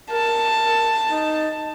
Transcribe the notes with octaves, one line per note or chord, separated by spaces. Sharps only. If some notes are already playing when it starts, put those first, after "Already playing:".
A#4 A5
D#4